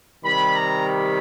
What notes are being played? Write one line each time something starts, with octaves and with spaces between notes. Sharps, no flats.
C3 D#3 G3 B5
A#5
B5